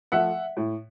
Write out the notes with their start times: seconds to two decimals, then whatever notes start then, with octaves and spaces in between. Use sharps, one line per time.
0.12 F3 A3 E5 F#5
0.57 A2